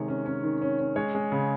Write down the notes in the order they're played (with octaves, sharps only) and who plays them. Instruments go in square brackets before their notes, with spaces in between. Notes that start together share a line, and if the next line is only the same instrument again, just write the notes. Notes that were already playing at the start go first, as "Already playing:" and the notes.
Already playing: [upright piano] C3 D#3 G#3 C#5
C#4
C#4
D#3
C#4
C#4
G#3 C#5
G#3
C#3